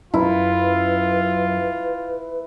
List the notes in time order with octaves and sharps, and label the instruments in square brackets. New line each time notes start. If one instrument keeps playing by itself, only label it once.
[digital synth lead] F#2 [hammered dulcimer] E4 [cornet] F4 [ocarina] B4